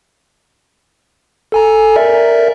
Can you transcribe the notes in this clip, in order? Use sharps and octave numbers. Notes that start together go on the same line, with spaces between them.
A4 G#5 A#5
A#4 D5 E5